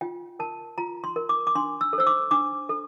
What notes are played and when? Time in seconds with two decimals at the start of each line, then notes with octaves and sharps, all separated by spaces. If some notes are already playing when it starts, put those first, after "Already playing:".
0.01 F4 G5
0.39 A#4 A5
0.78 F4 A#5
1.04 C6
1.16 A#4
1.29 D6
1.47 D6
1.55 D4 C6
1.81 E6
1.93 A4
1.98 C5 E6
2.07 D6
2.31 D4 D6
2.69 A4